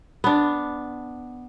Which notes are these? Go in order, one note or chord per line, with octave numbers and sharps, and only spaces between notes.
B3 D4